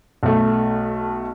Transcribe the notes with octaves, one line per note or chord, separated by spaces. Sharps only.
B1 A3